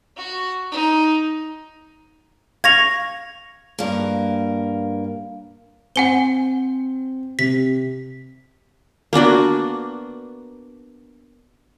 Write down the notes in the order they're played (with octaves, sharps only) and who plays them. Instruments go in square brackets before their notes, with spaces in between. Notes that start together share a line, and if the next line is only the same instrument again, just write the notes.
[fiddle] F#4
D#4
[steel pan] F5 C#6 [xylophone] G#6 A#6 F7
[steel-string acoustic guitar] G2 A#3
[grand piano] C4 [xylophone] F#5 G#5 G7
[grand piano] C3 [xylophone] B6
[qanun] A#3 B3 D4 F#4